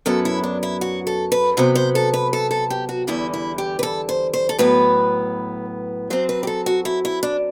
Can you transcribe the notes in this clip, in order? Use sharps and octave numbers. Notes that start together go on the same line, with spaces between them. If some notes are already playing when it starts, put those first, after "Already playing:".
F#2 F#3 B3 A4
E4
D4
E4
F#4
A4
B4
C3 F#3 B3 C5
C5
A4
B4
A4
A4
G4
F#4
E2 D3 G3 E4
E4
G4
B4
A4
C5
C5
A4
A2 F#3 B3 B4
F#2 F#3 C4 C5
B4
G4
A4
F#4
E4
E4
D4